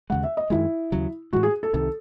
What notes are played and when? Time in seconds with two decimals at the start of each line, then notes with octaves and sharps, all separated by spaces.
0.10 D#2 C#3 G#3 F#5
0.23 E5
0.37 D#5
0.50 F#2 D#3 G#3 E4
0.92 D#2 C#3 F#3
1.33 A2 E3 G#3 F#4
1.43 G#4
1.63 A4
1.73 C2 C3 D#3 A4